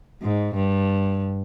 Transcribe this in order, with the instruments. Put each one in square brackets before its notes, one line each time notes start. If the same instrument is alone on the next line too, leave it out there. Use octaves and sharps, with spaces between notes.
[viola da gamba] G#2
G2